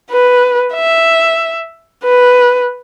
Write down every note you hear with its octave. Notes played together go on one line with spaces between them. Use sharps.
B4
E5
B4